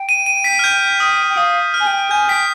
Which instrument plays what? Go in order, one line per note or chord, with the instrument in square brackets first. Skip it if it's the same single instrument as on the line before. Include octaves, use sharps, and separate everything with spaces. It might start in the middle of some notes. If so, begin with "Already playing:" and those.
Already playing: [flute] G5
[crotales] D#7
D#7
B6
F6
G6
D#6
[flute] G5
[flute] F5 [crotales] D#6
[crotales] F6
[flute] G#5
G5
[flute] G#5 [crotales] G6
[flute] G5 [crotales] B6